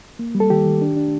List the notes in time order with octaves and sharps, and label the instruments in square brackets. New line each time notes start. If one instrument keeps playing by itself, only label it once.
[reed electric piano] A#3
G3
A4
D#3 G4
D#3
D4
D4